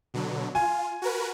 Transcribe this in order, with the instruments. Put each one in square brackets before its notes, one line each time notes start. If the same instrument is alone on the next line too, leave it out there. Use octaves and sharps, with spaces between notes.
[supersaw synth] B2 D3 F#3
[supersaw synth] F4 [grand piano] G#5
[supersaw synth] F#4 A#4 B4